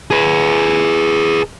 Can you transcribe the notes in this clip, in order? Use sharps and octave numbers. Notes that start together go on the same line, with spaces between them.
G#4 B4